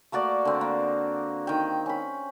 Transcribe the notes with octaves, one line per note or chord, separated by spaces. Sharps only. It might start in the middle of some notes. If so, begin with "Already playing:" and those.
A3 A#3 F#4 D5
D3 C4
A#3
D#3 G5
C#4 B5